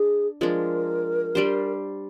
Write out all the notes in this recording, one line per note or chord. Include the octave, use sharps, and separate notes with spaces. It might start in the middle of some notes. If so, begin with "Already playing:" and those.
Already playing: D4 G#4
F3 G#3 D4 A#4
G3 D4 G4 C5